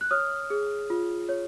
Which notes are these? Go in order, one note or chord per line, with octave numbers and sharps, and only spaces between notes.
F#6
C#5 D#6 F6
G#4
F4
C#5